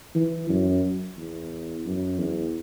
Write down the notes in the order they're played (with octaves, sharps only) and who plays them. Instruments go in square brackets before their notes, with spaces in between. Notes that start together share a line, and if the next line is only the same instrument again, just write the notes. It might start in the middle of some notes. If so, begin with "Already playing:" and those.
[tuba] E3
F#2
E2
F#2
E2